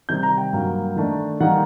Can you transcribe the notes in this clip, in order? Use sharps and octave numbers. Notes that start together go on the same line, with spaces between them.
C3 D#3 G3 G6
A#5
G5
G2 F#3 A#3
D#3 A3 D4
D#3 G3 A#3 D#4 F#5